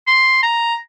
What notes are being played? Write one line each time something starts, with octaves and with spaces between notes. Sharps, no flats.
C6
A#5